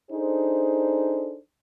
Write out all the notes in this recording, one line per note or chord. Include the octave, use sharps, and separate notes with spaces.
D4 D#4 G#4 A4 C5